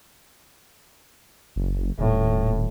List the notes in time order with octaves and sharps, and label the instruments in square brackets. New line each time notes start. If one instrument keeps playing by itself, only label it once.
[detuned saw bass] F#1
[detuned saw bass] D#1 [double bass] A2